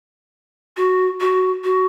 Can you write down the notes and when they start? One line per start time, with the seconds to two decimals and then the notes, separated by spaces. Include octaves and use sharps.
0.77 F#4
1.20 F#4
1.64 F#4